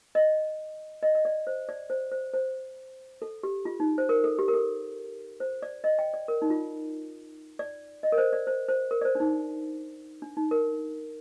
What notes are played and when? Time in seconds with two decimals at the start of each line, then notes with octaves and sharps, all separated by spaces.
0.15 D#5
1.03 D#5
1.15 D#5
1.25 D5
1.47 C5
1.69 D5
1.90 C5
2.12 C5
2.34 C5
3.22 A4
3.43 G4
3.65 F4
3.80 D#4
3.98 C5
4.09 A#4
4.24 A4
4.39 G4
4.48 A#4
4.53 A4
5.40 C5
5.62 D5
5.84 D#5
5.99 G5
6.14 D5
6.28 A#4
6.42 D#4
6.50 F4
7.59 D5
8.03 D#5
8.12 A#4
8.18 C5
8.33 D5
8.47 C5
8.68 C5
8.91 A#4
9.01 D5
9.05 C5
9.15 D4
9.20 D#4
10.22 D4
10.37 D#4
10.51 A#4